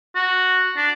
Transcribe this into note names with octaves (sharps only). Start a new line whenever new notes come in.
F#4
D4